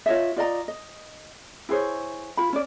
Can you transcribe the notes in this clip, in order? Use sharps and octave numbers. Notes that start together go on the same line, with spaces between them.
F4 C#5 D#5 E5
F4 D5 D#5 A#5
D#5
E4 G#4 C5 C#5
F4 B5
C#4 D5